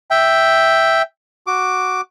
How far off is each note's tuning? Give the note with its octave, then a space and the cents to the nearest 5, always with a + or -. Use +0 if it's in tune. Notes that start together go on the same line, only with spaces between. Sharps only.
E5 +0 G5 +0
F#4 +0 D6 +0